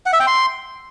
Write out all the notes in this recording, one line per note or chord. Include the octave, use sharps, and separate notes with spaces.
F#5
E5
G5
C6